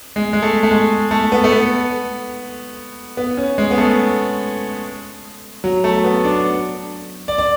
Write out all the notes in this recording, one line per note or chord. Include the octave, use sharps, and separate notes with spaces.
G#3
G#3
A3
A3
G#3
A3
B3
A3
B3
B3
C#4
G#3
B3
A3
F#3
A3
B3
D4
D5
D5